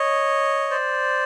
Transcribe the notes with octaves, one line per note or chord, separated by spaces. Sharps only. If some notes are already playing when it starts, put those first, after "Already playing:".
Already playing: C#5 D#5
C5 D5